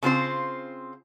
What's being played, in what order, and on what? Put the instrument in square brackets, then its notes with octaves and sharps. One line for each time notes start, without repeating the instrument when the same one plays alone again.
[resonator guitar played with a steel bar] C#3 C4 F4 C5